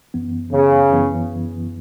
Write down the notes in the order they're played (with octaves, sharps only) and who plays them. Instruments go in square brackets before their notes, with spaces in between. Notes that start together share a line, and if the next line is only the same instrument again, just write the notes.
[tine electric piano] F#2 E3 B3
[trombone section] C#3
[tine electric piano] F#2 E3 B3